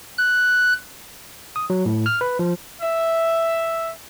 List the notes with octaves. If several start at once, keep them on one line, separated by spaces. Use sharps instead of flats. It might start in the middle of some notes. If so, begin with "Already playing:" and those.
F#6
D#6
F#3
A2
F6
B4
F3
E5